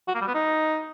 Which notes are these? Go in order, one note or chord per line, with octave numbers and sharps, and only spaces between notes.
F#4
A#3
G3
B3
D#4